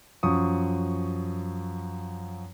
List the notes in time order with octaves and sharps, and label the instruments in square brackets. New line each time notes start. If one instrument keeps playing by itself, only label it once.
[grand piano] F#2 F3 C#6 D#6